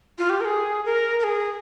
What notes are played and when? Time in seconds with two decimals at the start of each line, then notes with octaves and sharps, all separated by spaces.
0.18 F4
0.30 G4
0.41 A#4
0.45 G#4
0.85 A#4
1.19 A#4
1.24 G#4